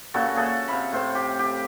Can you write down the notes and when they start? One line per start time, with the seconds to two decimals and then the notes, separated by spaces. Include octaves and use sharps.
0.14 A#2 C#3 F#4 A4
0.36 G#4 A4 E5 F#5
0.68 C3 F5 B5
0.93 A2 C5
1.15 G4
1.39 G4